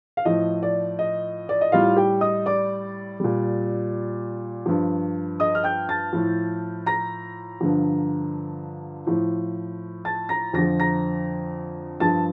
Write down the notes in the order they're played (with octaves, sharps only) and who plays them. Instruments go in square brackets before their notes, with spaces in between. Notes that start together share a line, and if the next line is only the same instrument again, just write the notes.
[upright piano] F5
A2 F3 D#5
D5
D#5
D5
D#5
A2 G3 F4 F5
G4 G5
D#5 D#6
D5 D6
A#2 G3
G2 F3
D#5 D#6
F6
G5 G6
A5 A6
A2 F3
A#5 A#6
G2 D3 F3
A2 F3
A5 A6
A#5 A#6
F2 D3 F3 A#6
A#5 A#6
G2 F3 A5 A6